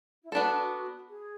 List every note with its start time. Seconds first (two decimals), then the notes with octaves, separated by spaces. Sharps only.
0.22 E4
0.32 B3 D4 F#4 A4
1.08 G#4